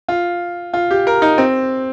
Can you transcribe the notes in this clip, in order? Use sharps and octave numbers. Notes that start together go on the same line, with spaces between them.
F4
F4
G4
A#4
D#4
C4